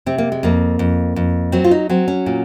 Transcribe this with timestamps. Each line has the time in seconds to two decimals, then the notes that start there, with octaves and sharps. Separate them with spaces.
0.06 C3 C4
0.18 A#3
0.32 G#3
0.43 F2 A#3
0.79 F2
1.16 F2
1.52 F#3 C4
1.64 F4
1.71 D#4
1.89 F#3 C4
2.08 C#4
2.26 A#2